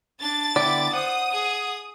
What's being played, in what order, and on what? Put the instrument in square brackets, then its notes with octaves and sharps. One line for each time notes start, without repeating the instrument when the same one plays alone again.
[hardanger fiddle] D4 A5 [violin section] A6
[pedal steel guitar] D3 B3 G5 [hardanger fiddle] E4 D6 [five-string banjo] D5
[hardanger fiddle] C5 [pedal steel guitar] F#5 [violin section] D#6
[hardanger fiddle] G#4